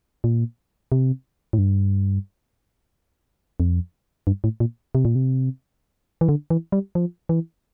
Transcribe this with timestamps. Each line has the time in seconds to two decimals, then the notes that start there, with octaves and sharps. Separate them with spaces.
0.24 A#2
0.92 C3
1.53 A2
1.58 G2
3.60 F2
4.27 G2
4.44 A2
4.60 A#2
4.95 C3
5.05 A#2
5.15 C3
6.21 E3
6.29 D3
6.50 E3
6.72 G3
6.95 F3
7.29 E3